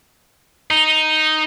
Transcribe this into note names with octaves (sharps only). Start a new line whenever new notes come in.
D#4